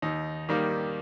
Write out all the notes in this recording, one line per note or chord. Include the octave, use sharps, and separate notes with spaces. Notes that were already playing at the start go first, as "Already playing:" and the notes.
D#2 D#4
D#3 G3 A#3